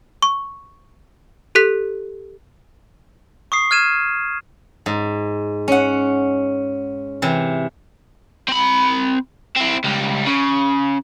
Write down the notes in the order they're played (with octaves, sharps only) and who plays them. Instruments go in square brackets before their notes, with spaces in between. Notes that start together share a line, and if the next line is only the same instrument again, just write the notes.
[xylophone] C#6
G4 A4 F#6 B6
[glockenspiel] C#6 D#6 C7
F6 G#6 D#7 E7
[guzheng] G#2
C#4 F#5
C3 E3
[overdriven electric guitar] C4 B5
C4 E4
C#2 G3
C#3